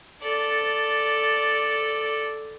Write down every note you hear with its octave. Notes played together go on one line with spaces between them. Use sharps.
A4 D5